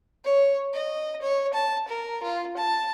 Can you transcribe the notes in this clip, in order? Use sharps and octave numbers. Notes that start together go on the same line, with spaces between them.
C#5
D#5
C#5
A5
A#4
F4
A5